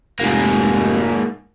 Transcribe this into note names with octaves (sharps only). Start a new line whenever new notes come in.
F1 G#2 A#3